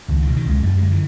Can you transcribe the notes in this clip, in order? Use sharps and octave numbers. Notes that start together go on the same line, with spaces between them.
C#2 D#3
B2 D#3
D#3
C#2 G#3
F#2 A3
D3 G#3
E3